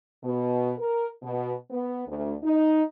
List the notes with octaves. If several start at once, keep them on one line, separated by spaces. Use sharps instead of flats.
B2
A#4
B2
B3
D2
D#4